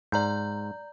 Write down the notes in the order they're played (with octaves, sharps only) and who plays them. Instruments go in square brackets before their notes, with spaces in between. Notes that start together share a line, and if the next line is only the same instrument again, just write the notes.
[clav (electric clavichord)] G#2 [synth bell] D5 A#5 G6